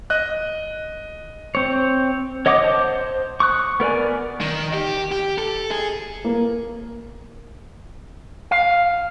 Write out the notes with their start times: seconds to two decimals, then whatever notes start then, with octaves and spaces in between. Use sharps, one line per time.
0.10 D#5 F#6
1.55 C4 C#5
2.46 C#5 D#5 F#5 D6 D#6
2.64 C5 A5
3.40 C#6 D#6 F#6
3.80 B3 A#4 D5 G#5
4.41 D#3
4.74 G4
5.12 G4
5.38 A4
5.71 G#4
6.24 A#3
8.51 F5